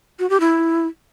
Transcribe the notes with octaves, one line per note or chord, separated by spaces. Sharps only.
F#4
G4
E4